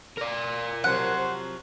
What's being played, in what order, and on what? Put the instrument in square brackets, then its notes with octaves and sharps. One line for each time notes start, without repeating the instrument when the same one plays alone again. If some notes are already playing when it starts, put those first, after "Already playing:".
[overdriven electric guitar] A#4 D5
[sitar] C3 F3 F#3 [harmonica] C5 [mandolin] F#5